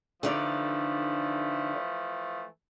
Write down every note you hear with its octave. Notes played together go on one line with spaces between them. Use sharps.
D3 E3 F3 A3 D#4 D5